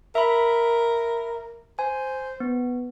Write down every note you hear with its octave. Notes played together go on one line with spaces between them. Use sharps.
A#4 E5 B5
C5 G#5
B3